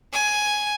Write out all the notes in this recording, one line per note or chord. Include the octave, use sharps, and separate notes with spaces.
G#5